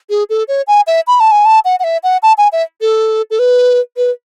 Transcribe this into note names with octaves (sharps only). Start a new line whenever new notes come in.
G#4
A4
C#5
G#5
E5
B5
A5
G#5
A5
F#5
F#5
E5
F#5
A5
G#5
E5
A4
A4
B4
B4